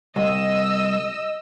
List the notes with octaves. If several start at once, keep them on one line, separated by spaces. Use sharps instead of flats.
C2 D#5 E6